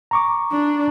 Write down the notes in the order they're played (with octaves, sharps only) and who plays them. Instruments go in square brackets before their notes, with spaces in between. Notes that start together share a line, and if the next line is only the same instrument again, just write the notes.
[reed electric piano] A#5 C#6 D6
[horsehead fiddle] D4